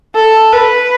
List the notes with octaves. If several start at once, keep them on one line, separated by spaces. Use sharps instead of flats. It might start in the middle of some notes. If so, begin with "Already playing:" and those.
A4
B4